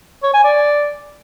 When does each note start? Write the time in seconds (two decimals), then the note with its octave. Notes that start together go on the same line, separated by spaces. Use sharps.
0.23 C#5
0.34 G#5
0.44 D5